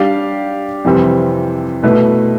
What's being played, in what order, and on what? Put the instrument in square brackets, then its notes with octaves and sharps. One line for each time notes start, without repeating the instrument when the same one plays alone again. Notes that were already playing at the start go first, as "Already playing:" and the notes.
Already playing: [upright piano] G3 D4 G4 D5 F5
F2 C3 E3 G3 C4
B2 A3 E4 B4